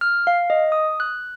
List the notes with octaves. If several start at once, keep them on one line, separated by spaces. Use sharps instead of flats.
F6
F5
D#5
D#6
F#6